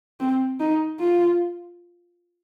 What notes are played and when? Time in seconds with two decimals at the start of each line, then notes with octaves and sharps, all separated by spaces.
0.20 C4
0.60 D#4
1.00 F4